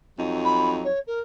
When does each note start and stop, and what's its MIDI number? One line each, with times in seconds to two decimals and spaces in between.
0.19 0.89 41
0.19 0.89 54
0.19 0.89 63
0.45 0.69 83
0.84 1.00 73
1.07 1.20 70